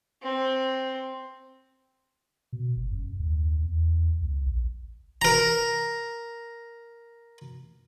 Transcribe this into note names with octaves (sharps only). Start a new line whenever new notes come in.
C4
B2
G1
F#2
D#2
E2
C#2
A#1
A#4 A#5